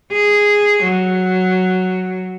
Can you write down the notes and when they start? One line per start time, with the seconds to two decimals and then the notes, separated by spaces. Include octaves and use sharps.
0.12 G#4
0.84 F#3